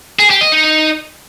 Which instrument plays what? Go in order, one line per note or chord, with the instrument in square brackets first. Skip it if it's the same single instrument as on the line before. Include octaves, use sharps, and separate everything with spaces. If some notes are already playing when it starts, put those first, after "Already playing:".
[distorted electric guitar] G#4
G4
D#5
D#4